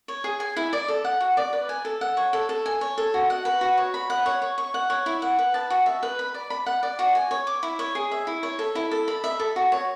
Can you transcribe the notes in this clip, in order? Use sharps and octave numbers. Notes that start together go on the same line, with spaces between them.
C#5
G#4
G#5
E4
D5
A4
F#5
F#4
D5
B4
G#5
A4
F#5
C#5
A4
A4
G#5
C#5
A4
F#4
F#5
B4
F#4
C#5
B5
F#5
C#5
C#5
C#6
F#5
C#5
E4
F#5
B4
A5
F#4
E5
B4
B5
D5
B5
F#5
D5
F#4
G#5
C#5
D6
E4
C#5
G#4
E5
E4
C#5
A4
E4
A4
B5
E5
A4
F#4
C#5